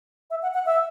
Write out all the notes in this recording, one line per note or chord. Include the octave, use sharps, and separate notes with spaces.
E5
F#5
F#5
E5